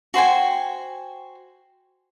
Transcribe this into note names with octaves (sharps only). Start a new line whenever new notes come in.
F#4 C5 G5 G#5